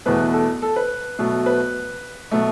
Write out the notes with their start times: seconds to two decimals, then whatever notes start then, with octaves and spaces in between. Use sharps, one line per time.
0.06 E2 B2 A3 B4
0.33 A4
0.62 A4
0.76 B4
1.18 B2 F#3 A3
1.46 B4
2.31 B2 F#3 A3